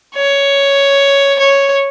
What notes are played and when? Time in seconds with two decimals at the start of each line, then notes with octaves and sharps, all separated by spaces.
0.15 C#5
1.39 C#5